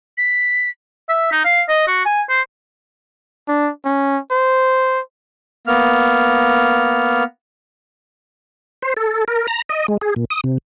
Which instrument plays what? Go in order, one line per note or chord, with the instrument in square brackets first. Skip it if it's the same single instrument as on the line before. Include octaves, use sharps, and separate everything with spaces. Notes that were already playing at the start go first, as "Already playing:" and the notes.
[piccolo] B6
[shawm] E5
D#4
F5
D#5
F#4
G#5
C5
[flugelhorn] D4
C#4
C5
[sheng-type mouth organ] A#3 B3 F6
[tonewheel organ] C5
A4
A#4
A#5
D#5
G#3
G#4
A#2
D#6
C3